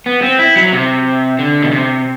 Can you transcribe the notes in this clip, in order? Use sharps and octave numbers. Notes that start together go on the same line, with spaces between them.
B3
C4
E4
F#3
C3
D3
B2
C3